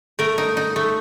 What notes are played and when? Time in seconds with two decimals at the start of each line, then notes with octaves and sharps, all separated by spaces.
0.19 A3 A#4
0.38 D#4
0.57 D#4
0.76 A3